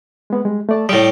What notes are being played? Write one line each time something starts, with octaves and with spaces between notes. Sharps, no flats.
G#3 B3
G3 G#3
A3 D5 A5
A2 G3 G5 D#6